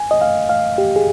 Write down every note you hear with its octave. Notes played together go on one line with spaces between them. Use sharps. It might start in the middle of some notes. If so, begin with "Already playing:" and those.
Already playing: G#5
D#5
F5
F5
G4
G#4